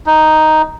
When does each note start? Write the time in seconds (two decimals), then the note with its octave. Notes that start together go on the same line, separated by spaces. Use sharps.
0.06 D#4